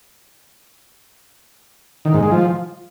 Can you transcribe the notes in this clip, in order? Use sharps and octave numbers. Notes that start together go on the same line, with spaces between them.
D#3
G#2
G#3
F3